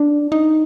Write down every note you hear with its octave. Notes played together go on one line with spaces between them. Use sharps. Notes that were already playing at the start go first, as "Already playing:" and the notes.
Already playing: D4
D#4